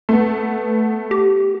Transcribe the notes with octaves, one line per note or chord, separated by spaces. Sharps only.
A3 B3
G4